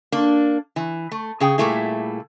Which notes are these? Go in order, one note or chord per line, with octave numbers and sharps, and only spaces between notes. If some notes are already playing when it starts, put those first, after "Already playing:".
A#3 D4
E3
A3
C#3 G#4 G5
A#2 E3 G3 A3 E4 G#4